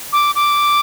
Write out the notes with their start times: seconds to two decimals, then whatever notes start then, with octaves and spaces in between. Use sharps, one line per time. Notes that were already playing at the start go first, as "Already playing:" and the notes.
0.13 D6
0.35 D6